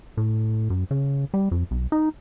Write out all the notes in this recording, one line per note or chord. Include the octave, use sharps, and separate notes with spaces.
A2
F#2
C#3
G3
F2
B1
D#4